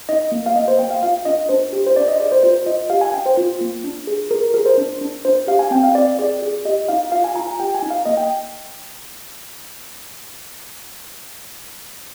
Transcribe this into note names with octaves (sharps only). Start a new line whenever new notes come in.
D#4 D#5
A#3
F5
A#3 D#5
C5
A#3 G5
F5
F4 F5
D4 D#5
D4 C5
G4
C5
D4 D5
D#5
G#4 D5
C5
F4 C5
F4 D#5
G4 F5
G#5
D4 G5
C5
F4
A#3
D4
G#4
G#4 A#4
G#4 A#4
C5
D4
D4
D4 C5
G4 F5
G#5
C4 G5
F5
C4 D5
G#4 D5
G#4
G4 D#5
D#4 F5
F4 F5
G#5
F4 A#5
G#5
G4 G5
G#5
D#4
F5
A#3 D#5
G5